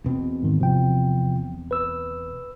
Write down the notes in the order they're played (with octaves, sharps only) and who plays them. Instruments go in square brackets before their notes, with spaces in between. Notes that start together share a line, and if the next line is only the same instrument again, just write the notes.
[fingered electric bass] E1 B2 C4
[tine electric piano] G#2 D#3
C3 F3 G5
B4 E6